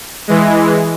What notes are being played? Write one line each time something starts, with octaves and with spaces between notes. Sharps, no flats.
E3 G#3